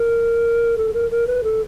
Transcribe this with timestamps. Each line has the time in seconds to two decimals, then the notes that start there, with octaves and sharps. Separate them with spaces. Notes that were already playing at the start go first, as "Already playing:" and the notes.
Already playing: A#4
0.78 A4
0.94 A#4
1.11 A#4
1.27 B4
1.44 A4